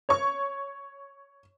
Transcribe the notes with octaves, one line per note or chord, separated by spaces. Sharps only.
C#5 C#6